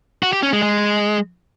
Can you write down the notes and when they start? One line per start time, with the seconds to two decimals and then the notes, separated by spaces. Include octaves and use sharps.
0.23 F#4
0.33 G4
0.43 C#4
0.53 G#3
0.63 G#3